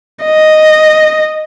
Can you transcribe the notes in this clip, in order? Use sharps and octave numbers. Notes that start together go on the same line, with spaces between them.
D#5